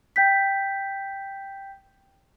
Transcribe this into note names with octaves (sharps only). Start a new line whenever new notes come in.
G5 G6 B6